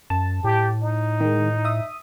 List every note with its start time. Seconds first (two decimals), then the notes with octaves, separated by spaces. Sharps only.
0.10 F#2 A5
0.44 A2 G4
0.82 D#4
1.21 D#3 G#3
1.65 E5 D#6